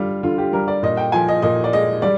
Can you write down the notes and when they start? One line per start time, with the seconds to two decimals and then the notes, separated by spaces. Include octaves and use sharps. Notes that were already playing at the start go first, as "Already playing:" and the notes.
Already playing: D3 G3 F4
0.23 D3 F4
0.38 G4
0.53 G3 A#4
0.68 D5
0.83 A#2 D#5
0.97 G5
1.12 F3 G#5
1.28 D#5
1.42 A#2 D#5
1.64 D5
1.73 G#3 D#5
2.02 G3 D5